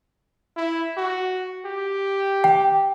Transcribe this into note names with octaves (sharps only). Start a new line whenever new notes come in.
E4
F#4
G4
G5